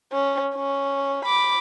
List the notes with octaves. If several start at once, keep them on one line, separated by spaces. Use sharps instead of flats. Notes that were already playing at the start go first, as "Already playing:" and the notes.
C#4
C#4
B5 D6